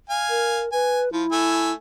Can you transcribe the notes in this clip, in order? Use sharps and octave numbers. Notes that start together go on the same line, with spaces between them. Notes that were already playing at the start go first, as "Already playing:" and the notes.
F5 G#5
A#4
B4 G#5
F3 E4
A3 G#5 E6